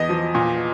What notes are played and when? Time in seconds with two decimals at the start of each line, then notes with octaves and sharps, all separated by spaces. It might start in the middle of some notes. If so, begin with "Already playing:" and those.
Already playing: E2 D#5
0.09 F3
0.35 A#2